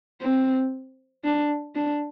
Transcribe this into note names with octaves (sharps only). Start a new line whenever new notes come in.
C4
D4
D4